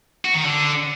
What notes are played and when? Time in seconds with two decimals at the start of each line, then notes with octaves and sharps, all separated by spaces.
0.25 F#4
0.34 D#3
0.44 D3